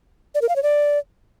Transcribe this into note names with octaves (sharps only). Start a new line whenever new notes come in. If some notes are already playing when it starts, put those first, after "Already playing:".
D5
A#4
F5
C#5
D5